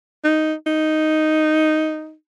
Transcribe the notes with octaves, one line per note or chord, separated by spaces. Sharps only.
D#4
D#4